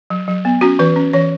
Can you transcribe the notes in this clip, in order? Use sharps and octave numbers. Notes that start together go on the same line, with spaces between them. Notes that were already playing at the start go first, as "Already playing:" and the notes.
F#3
F#3
B3
C#4 F#4
E3 B4
C#4
E3 C#5